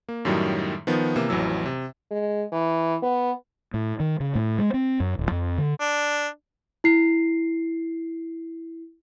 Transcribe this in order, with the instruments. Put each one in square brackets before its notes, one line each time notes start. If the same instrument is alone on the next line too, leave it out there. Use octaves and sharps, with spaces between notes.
[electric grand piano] A#3
F#2 A2 D#3 F#3 G3
D#3 F3 B3
C3 E3 A#3
A1 F2 E3 F#3 E6
C3
[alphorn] G#3
E3
B3
[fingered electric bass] A2
D#3
C#3
A2
G#3
C4
F#2
D1
F2
D3
[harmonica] D4
[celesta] E4 C7